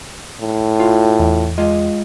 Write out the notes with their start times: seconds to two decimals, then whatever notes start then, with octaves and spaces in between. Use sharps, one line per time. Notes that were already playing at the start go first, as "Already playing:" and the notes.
0.40 A2
0.80 F4
1.20 E2
1.58 G#3 F4 D#5